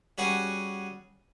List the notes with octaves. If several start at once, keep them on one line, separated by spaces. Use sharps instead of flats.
G3 C#4 F#4 G#4 F#5